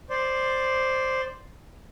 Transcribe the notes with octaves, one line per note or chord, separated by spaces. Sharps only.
C5 D5